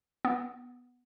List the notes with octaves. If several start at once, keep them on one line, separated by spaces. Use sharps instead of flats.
B3